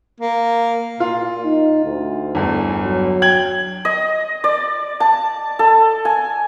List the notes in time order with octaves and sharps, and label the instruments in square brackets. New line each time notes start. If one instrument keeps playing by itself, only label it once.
[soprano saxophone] A#3
[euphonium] A#2 [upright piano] F4
[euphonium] D#4
D2
[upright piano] G1 E2
[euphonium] F#3
[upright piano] G5 G#6 F#7
[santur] D#5
D5
A5
A4
G#5